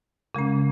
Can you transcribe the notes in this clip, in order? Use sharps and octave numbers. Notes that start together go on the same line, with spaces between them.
C#3 G#3 C#4